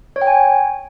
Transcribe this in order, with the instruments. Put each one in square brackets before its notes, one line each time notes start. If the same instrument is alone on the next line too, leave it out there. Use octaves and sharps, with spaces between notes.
[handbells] C#5
G5
G#5